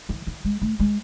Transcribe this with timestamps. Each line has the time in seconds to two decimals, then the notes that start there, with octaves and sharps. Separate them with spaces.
0.09 E3
0.27 E3
0.45 G#3
0.62 A3
0.79 G#3